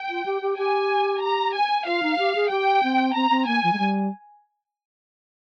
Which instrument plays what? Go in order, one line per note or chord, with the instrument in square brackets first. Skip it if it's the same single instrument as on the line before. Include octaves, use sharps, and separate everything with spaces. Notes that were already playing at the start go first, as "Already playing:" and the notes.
Already playing: [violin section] G5
[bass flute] F4
G4
G4
[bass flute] G4 [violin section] G#5
[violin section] A#5
G#5
[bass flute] F4 [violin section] F5
[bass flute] D#4
G4
G#4
[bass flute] G4 [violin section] G5
[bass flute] C4
[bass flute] C4 [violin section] A#5
[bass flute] C4
[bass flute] A#3 [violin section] G#5
[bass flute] F3
G#3
G3